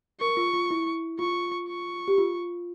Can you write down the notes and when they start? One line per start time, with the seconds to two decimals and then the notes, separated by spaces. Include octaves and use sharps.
0.20 A#4 C#6
0.37 F4
0.54 F4
0.71 E4
1.19 F4 C#6
1.68 C#6
2.08 G4
2.18 F4